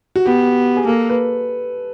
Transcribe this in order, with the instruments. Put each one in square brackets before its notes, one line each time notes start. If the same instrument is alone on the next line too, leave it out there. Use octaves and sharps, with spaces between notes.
[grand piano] F#4
[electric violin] B3 [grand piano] G4
[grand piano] G#4
[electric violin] A#3 [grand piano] A4
[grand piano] B4